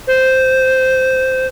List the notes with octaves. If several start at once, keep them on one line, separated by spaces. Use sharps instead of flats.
C5